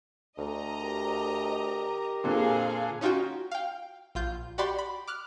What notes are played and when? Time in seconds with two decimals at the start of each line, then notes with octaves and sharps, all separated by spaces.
0.38 D2 D#5 A#5
0.81 G4 A#4
2.24 F2 A#2 D3 G#4 F5
3.01 C#4 D#4 F4 F#4 G5
3.52 F5 G5
4.15 A#1 F4 G6
4.58 F#4 G4 D5 B5 C6
4.79 B5
5.08 D6 F6 F#6